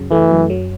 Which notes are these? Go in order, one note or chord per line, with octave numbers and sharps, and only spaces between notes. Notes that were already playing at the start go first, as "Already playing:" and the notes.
Already playing: F#2 C#3 F#3
E3 A3
F#2
F#3